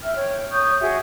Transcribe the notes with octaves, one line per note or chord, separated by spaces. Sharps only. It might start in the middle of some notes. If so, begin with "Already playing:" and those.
E5 G5 F6
C#5 G5
C#5 C#6 D#6 G6
F#4 G#4 E5 G5